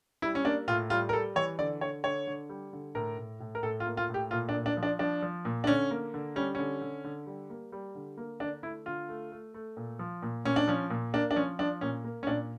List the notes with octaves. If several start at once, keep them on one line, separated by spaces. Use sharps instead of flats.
G3 E4
C#4
A#3 D4
A2 F4
G3 F4
A#4
G3 A4
E3 C#5
D3 D5
D3 C#5
D3 C#5
D3
G3
D3
A2 A#4
A2
A2
A#4
A2 A4
F4
A#3
F4
A2
G4
A#2 F4
D4
A#2
D4
F3
D4
F3 D4
F3
A#2
D4
D3 C#4
A#3
D3
G3 C#4
D3 C#4
D3
D3
G3
A#3
G3
D3
A#3
D3 D4
A3 E4
D3 F4
A3
A3
A3
A#2
F3
A#2
A#2 C#4
D4
F3 C#4
A#2
A#3 D4
D4
F3 C#4
F3 D4
A#2 C#4
A#3
C#4
A#2 D4